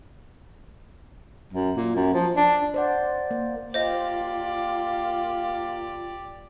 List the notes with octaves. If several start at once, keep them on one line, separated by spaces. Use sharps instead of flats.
F#2
A#2
F#2
F3
D4
C5 D5 F#5
A#3
A#3 F4 G4 C5 D5 D#5